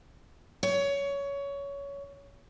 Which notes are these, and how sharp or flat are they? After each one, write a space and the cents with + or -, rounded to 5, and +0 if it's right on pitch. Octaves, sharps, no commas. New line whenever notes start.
C#5 +20